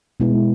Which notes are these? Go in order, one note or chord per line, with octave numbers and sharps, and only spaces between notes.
B2 G#3 B3 E4